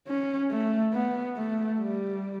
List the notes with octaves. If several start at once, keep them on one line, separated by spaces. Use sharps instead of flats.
C#4
A3
B3
A3
G3